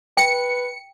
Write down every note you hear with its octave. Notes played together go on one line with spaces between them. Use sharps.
B4 G5 C#7